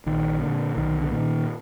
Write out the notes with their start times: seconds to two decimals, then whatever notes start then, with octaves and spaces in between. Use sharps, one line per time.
0.06 A#1 D#3
0.42 A#2 D3
0.77 B1 D#3
1.01 D3
1.11 A#2 D#3